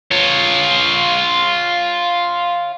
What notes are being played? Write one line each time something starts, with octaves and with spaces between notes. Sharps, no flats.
F4 C#5